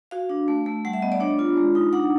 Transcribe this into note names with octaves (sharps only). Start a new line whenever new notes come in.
F#4 F5
D4
A3
A3
G3 F#5
E5
B3 D#5
D5
D4 C#5
F4
G#3
D#4
D4 F#5